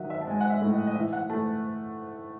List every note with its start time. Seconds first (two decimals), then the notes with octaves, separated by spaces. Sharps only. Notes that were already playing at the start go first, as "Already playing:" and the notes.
Already playing: D#3 F#3 D#5 E5 F#5
0.10 E5
0.21 A5
0.27 G#3 G#5
0.41 F#5
0.50 E5
0.62 A2
0.73 D#5
0.87 D#5
0.95 E3 E5
1.13 F#5
1.30 A3 A5